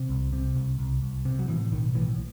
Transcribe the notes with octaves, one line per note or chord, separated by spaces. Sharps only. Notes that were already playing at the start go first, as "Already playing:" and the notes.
Already playing: C3
C2
C3
C2
C2
C2
C3
F#3
A2 E3
B1 D#3
A2 E3